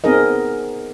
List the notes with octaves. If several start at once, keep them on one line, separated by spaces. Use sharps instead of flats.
B3 C4 D#4 G#4 A#4 D#5